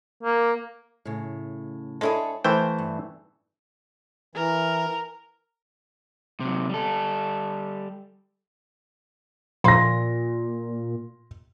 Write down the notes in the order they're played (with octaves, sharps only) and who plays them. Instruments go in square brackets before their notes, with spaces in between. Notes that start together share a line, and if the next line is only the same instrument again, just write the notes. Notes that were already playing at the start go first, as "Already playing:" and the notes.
[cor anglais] A#3
[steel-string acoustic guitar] A2 C#3
[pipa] G#3 E4 G#4 [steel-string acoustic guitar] D4 A4 C#5
[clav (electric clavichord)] E3 A3 G5 [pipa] C5 [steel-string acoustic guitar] F5
[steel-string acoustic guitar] G2
[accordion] E3 [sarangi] A#4
[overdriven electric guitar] C3 F#3
G3 A4
[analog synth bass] A#2 [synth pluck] F3 A#3 F5 [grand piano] C6 A#6